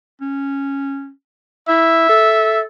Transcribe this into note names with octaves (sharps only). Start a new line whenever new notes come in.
C#4
E4 E5
A4